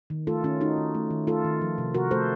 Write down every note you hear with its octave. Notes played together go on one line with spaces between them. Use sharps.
D#3
A3 F4 A4
D#3 C#4 F4
A3 D#4 F#4
D#3
A3
D#3
A3 F4 A4
D#3
F3
C3
C3 F#4 A#4
A3 A4 C5